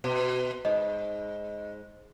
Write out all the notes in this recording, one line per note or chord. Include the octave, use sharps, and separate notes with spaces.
B2
G#2 D#5